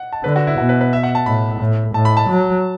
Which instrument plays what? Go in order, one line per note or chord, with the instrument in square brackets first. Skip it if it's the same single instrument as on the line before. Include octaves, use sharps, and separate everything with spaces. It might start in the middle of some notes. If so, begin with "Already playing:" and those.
Already playing: [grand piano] F#5
A5
[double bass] D3 [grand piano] B4
[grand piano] F#4
E4
[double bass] B2 [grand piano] F#4
[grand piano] B4
B4
E5
F#5
A5
[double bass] A2 [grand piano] B5
[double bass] A2
[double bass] A2 [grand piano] A5
[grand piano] B5
A5
[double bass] F#3